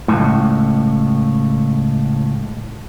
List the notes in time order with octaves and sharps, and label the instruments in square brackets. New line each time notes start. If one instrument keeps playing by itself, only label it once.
[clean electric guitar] C#2 F#2 A2